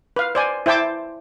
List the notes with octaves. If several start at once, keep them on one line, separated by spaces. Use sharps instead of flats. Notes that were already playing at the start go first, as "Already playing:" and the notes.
B4 F5
C5 D5 G#5
E4 C5 G5 A5 D6